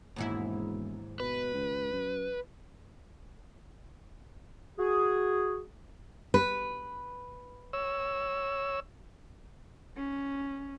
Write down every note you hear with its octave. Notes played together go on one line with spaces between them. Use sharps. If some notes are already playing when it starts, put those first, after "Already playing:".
E1 D#2 G#2 E4
B2 B4
C#2
F#2
F#4 G#4
B4
C#5 E6
C#4